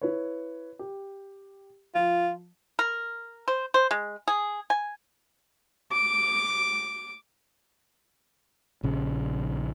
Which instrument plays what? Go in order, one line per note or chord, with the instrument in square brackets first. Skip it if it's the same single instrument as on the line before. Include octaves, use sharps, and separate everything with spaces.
[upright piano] E4 B4 C#5
G4
[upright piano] F3 [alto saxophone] F4
[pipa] A#4
C5
C5
G#3
G#4
G#5
[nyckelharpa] D6
[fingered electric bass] A#1 C#3